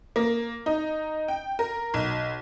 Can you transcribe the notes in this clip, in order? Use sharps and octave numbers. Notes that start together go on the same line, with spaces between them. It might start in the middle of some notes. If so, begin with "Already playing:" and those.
A#3
D#4
G5
A#4
B1